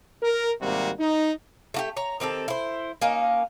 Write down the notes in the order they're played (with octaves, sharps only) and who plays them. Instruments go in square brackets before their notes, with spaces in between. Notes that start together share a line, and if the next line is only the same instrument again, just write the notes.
[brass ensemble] A#4
G#1 C3 G3 A#3 F#4
D#4
[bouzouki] A3 F#4 G4
C#5 A#5
D#3 C4 G4 A4
E4 C5
A#3 C#4 D#4